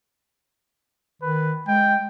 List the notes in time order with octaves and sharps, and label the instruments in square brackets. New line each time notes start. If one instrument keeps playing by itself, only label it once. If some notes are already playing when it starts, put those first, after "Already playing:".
[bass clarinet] D#3 [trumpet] B4
[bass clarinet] G#3 [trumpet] G5